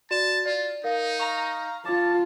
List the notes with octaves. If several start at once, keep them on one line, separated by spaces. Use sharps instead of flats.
F#4 D5 A5 E7
F4 D5
D#4 A#4 F5
F5 A#5 C#6
F4 C#5 A5 D6